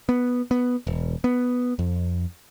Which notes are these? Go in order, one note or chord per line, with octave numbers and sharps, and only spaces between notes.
B3
B3
E1
B3
F2